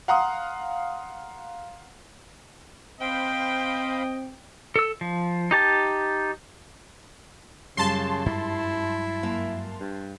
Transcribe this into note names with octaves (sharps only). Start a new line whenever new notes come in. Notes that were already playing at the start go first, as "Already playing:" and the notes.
F5 F#5 A#5 C6 D#6
C4 C5 D#5 F5 G5 B5
A4 E6
F3
D#4 G4 A5
F#2 C#3 G3 F4 A5 C6
G2 F#3 G#3 E4
F#2 A#3 E5
G2